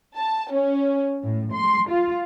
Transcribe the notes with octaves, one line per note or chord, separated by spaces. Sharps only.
A5
C#4
A2
C6
F4